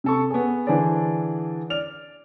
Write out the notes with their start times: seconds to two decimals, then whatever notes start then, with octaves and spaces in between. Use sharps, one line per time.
0.04 C3 A4 C#6
0.30 B3 G#4
0.67 D3 E3 D4 G#4 C5 D5
1.70 D5 F6 F7